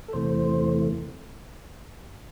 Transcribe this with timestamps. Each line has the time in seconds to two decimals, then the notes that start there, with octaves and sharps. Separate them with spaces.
0.08 A4
0.13 E2 C3 E3 A3 C5